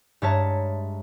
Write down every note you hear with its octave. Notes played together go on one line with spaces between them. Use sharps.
G2 G#3 C#5 E5 A5 A#5